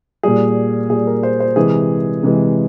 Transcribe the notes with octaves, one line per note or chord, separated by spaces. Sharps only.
A#2 G3 G#4
A#2 G3 G#4
A#4
C5
C5
C3 E3 G#3 G#4
C3 E3 G#3